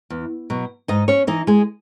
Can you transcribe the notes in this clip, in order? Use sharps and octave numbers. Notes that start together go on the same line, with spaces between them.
E2
B2 F#3
G#2 D#4 D#5
C#4 C#5
E3 D#4 D#5
G#3 G#4